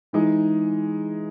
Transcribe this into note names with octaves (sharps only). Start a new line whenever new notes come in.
E3 G#3 D#4 G#4